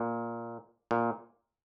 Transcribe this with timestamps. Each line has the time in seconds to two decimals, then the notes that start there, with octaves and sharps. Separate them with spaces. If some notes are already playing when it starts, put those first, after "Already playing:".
Already playing: A#2
0.91 A#2